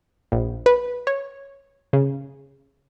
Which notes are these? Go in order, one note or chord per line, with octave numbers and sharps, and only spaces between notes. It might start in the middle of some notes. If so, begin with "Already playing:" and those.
A#1
B4
C#5
C#3